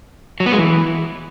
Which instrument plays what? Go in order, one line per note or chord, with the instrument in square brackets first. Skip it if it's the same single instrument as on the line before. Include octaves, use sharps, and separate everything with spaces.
[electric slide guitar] F#3
B3
G#3
E3